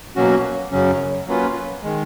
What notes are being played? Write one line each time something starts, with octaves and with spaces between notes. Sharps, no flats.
B2 F#3 A#3 C#4 F#4
F#2 C#3 F#3 C#4
F#3 A#3 C#4 F4 B4
D#3 G#3